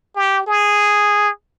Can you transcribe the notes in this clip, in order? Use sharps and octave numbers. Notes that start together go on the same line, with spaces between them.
G4
G#4